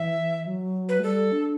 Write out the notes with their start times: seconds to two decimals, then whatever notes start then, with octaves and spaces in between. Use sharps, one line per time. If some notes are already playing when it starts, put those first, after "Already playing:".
Already playing: E3 E5
0.47 F#3
0.89 B4
1.00 A3
1.03 G3 A4
1.32 D4